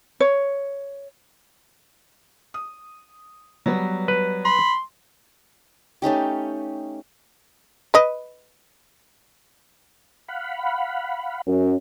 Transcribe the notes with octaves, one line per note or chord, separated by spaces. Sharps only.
C#5
D#6
F#3 G3 B3
B4
B5 C6
A3 C#4 D#4 G4
B4 D#5
F5 F#5 B5
F#2